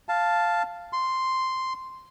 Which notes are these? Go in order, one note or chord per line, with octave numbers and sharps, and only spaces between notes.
F5 A5
C6